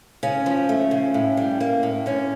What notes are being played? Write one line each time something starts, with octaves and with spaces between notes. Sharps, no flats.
C#3 C#4
F3
A3
C#3
A2
G3
A#3
A2
D3 C#4